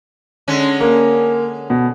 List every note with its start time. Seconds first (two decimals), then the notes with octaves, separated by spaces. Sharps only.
0.48 D3 G#3 C#4
0.80 A#3
1.70 B2